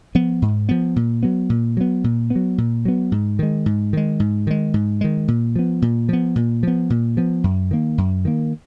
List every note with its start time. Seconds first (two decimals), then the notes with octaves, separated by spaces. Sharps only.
0.15 F3 B3
0.42 G#2
0.69 F3 B3
0.96 A#2
1.23 F#3 B3
1.50 A#2
1.77 F#3 B3
2.04 A#2
2.30 B3
2.36 F#3
2.58 A#2
2.85 F#3 B3
3.12 G#2
3.39 D#3 G#3
3.66 G#2
3.93 D#3 G#3
4.20 G#2
4.47 D#3 G#3
4.74 G#2
5.01 D#3 G#3
5.28 A#2
5.56 F3 B3
5.82 A#2
6.09 F3 B3
6.36 A#2
6.63 F3 B3
6.90 A#2
7.17 F3 B3
7.44 F#2
7.71 D#3 A#3
7.98 F#2
8.25 D#3 A#3